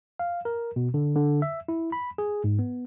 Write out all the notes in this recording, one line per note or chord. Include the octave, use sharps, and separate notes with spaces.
F5
A#4
B2
D3
D3
E5
E4
B5
G#4
G#2
B3